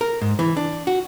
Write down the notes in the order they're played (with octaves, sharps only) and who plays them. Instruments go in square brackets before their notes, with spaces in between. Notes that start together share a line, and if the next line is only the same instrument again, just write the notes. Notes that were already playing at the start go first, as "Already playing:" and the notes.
[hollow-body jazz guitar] A#4
G#2
E3
D4
F#4